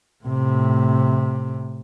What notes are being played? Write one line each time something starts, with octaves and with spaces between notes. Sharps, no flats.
A2 C3